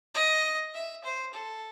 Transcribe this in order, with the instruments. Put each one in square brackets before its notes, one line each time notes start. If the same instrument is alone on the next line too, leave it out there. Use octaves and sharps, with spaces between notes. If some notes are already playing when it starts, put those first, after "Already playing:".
[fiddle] D#5
E5
C5
A4